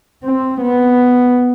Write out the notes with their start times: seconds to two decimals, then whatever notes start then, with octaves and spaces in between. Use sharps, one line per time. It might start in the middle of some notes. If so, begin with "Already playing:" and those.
0.24 C4
0.61 B3